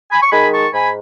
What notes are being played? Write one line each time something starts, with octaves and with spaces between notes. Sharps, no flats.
G#5 B5
C#6
D#3 G#3 G#5 B5
A5 C#6
G#2 G#5 B5